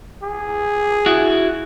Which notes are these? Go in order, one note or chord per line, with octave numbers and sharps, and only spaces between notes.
G#4
E4 F#4